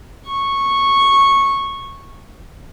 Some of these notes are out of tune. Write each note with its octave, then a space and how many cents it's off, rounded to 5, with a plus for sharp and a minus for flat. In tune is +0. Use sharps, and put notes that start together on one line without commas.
C#6 -10